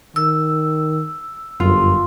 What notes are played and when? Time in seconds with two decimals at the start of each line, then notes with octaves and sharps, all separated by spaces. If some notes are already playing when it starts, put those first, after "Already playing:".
0.16 D#3 E6
1.60 G1 F#2 F4